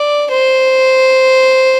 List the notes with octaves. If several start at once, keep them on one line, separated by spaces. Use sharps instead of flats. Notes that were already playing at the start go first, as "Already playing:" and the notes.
Already playing: D5
C5